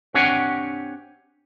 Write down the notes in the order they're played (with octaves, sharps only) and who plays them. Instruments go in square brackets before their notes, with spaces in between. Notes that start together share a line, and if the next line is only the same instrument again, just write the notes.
[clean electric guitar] C4 D4 G4 C#5 F#5 G#5